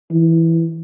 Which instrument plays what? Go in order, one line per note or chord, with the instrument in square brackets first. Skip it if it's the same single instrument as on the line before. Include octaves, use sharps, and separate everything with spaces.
[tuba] E3